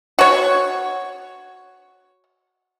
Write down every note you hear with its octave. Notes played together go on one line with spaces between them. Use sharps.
F#4 C#5